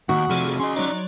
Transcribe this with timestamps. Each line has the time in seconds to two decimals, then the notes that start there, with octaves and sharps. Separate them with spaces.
0.09 D#2 D#3 F#4 F#5
0.30 C3 F3 A3 G#4 D5
0.60 C#4 G#4 D#5 C6
0.76 F#3 D#4 C#5 D5